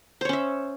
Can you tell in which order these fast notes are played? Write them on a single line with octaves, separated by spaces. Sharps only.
C5 C#5 C#4 E5